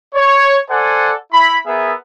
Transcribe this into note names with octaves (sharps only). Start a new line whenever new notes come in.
C#5
A4 C5 D5 F#5 G#5
E4 B5
B3 G#4 A#4 E5